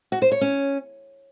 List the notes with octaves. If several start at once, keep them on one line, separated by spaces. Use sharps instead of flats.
F#4
C5
C#5
C#4